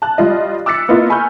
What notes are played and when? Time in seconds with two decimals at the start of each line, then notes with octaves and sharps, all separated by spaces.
0.02 A5 F#6
0.18 G3 F4 D#5
0.66 D6 E6 F#6 A6 B6 C#7
0.89 A#3 B3 E4 F4 D#5
1.10 G#5 B5 C#6 E6 F6 G6